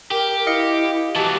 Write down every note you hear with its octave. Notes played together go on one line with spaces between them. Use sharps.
G4 A#4
E4 D#5 F5 C#7
E3 F#3 G4 A5